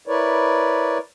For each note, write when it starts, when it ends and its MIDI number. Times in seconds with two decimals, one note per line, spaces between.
0.07 0.98 64
0.07 0.98 70
0.07 0.98 71
0.07 0.98 73
0.07 0.98 74